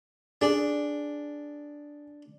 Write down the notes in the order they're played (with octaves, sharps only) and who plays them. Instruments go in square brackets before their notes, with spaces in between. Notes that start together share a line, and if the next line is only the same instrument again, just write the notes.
[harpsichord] D4 [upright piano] G#4